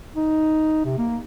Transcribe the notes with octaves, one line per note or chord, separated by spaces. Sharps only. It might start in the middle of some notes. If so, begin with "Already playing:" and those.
D#4
C3
A#3